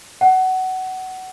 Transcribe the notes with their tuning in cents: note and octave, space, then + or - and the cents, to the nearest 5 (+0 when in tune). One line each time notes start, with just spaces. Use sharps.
F#5 +20